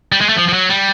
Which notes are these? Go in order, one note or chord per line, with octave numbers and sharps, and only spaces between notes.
G3
G#3
A3
F3
F3
F#3
G3